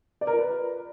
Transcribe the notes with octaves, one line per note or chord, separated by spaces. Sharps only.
D5
A#4
F4
B4